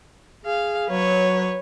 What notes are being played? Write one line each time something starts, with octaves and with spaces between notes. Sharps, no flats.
G#4 F5
F#3 B4 C#5